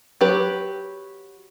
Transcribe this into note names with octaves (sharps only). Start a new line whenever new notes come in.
F#3 G4 B4